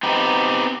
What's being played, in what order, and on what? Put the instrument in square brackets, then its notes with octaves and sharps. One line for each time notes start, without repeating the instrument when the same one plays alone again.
[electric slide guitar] B3 C4 D#4 G4